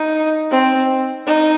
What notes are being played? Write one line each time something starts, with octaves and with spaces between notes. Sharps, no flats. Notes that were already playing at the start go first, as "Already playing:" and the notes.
Already playing: D#4
C4
D#4